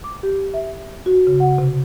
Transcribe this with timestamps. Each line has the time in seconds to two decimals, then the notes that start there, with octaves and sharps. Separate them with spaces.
0.04 D6
0.23 G4
0.54 E5
1.06 F#4
1.27 C#3
1.40 F#5
1.58 C3